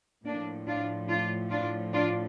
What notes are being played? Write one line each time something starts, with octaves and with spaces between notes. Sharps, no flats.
A2 F3 A#3 D4
D4 F4
D4 F4
D4 F4
D4 F4